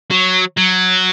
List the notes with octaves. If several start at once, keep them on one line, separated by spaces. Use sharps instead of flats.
F#3
F#3